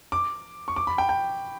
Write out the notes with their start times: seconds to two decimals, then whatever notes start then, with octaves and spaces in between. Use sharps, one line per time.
0.12 D6
0.68 C#6
0.76 D6
0.87 B5
0.98 G5
1.09 G5